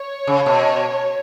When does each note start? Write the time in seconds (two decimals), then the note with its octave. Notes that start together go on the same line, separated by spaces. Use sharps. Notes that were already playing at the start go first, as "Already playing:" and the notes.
Already playing: C#5
0.27 C#3
0.46 B2